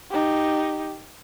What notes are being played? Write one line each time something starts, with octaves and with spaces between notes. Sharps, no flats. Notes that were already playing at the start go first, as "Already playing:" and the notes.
D#4 G4